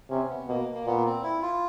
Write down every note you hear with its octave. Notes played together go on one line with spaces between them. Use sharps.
C3 C#4
B3
B2 A#3
A#3
A#2 B3
C4
E4
F4